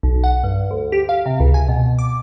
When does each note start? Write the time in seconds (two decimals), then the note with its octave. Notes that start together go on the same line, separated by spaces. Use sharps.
0.03 B1
0.24 F#5
0.44 G2
0.71 D2
0.92 G4
1.09 F5
1.26 C3
1.40 C#2
1.54 G#5
1.68 B2
1.99 D6